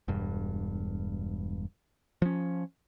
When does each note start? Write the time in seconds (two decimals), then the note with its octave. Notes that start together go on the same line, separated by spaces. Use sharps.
0.08 E1 G2
2.22 F3 C#4